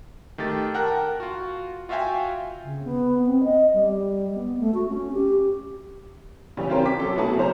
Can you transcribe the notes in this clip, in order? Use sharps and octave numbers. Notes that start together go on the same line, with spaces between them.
D#3 A3 G4 A6
A#4 F#5 G5 A5 F#6
F4 F#4
F4 F#4 E5 F5 G5 G#5
C#3
B3
C4
D#5
G3
B3
A3
F#4
C#4
G4
C#3 E3 G3 C#4
C4 C#4 F4 A#4 C5 G5
D6 B6
F#3 A4
A3 B3 E4 F#4 G#4 A5
F#1 F#3 C#4 C5 A#5